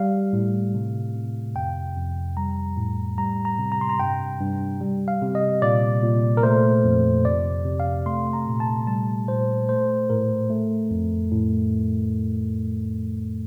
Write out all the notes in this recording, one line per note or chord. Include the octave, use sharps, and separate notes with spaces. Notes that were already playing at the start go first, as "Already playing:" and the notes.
Already playing: G3 F5
A2
C3
C3
F2 G5
F2
G3 A#5
A2
G3 A#5
A#5
C3
A#5
C6
A#5
G2 G5
G2
G3
F5
C3
D#5
A#2 D5
A#2
A#4
A3 C5
F2
C3 D5
C3
F5
A3 C6
A#5
A#2
A5
G3 A5
A#2 C5
A3 C5
A2 A#4
A3
F2
A2